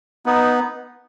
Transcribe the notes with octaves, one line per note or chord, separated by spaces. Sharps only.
B3 D#4